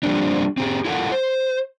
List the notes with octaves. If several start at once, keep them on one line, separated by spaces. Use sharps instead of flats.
F3 G3 A#3 C4 D4
C4 G4 G#4
E4 F4 A4 A#4 F#5
C5